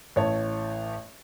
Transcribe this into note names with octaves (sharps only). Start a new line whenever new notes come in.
A1 C#5 A5